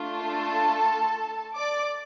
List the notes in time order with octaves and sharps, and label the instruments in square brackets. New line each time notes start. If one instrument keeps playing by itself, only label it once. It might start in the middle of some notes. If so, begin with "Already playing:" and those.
Already playing: [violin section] A3 D4 F4
A4 A5
D5 D6